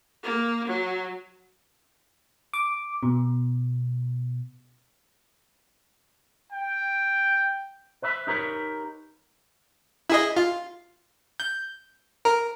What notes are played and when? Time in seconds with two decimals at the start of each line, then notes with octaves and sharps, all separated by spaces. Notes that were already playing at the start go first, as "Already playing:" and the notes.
0.23 A#3
0.68 F#3
2.53 D6
3.03 B2
6.52 G5
8.02 B4 C5 E5 B5
8.27 D#4 G4 A#4 B4 C#5
10.10 E4 G#4 D#5
10.36 F4
11.40 G6
12.25 A#4